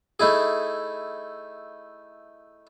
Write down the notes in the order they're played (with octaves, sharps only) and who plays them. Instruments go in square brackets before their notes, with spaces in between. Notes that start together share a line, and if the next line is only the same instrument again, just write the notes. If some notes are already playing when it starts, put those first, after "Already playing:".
[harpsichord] A3 D#4 E4 G#4